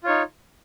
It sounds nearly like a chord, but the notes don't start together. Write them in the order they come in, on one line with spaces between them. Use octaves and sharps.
F4 C#5 D#4